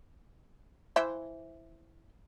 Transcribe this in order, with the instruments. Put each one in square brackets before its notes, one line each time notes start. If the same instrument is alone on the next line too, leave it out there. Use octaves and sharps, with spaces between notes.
[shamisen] E3 C5 E5